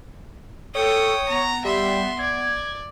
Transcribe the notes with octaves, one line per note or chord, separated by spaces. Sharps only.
A4 C#5 G5 D#6
B3 A#5
G3 E5 C6
D5 G#6